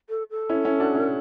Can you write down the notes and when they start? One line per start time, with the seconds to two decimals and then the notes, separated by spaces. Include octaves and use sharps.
0.09 A4
0.30 A4
0.49 C#4 E4
0.65 C#4 E4
0.80 D4 F#4
0.95 C#4 E4